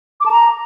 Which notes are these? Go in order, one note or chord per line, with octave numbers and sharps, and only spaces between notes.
D6
A5
A#5